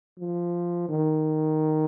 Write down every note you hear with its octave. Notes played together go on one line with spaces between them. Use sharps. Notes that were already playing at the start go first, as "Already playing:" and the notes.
F3
D#3